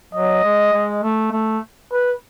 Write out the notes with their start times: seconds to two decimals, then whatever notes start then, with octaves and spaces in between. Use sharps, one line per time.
0.13 F#3 D#5
0.44 G#3
0.73 G#3
1.03 A3
1.32 A3
1.92 B4